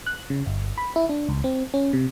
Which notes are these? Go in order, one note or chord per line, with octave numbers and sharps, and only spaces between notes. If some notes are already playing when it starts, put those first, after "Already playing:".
F#6
C#3
G1
B5
E4
D4
C#2
C4
C#4
C3